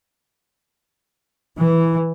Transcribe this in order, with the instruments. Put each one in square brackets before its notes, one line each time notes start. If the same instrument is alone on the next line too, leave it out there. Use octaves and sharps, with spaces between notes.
[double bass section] E3